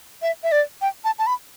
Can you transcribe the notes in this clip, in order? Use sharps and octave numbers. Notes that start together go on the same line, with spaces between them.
E5
E5
D5
G5
A5
A5
B5